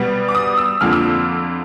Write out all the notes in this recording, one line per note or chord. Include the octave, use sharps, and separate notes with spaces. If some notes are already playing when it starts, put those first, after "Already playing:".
Already playing: B2 G3 B3
D6
D#6
E6
F2 D3 F3 A#3 F6
E6